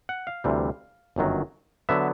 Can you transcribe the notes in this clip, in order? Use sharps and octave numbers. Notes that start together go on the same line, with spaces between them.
F#5
F5
D2 C3 E3 G3
G1 F#2 D#3 F#3
D3 F#3 B3 E5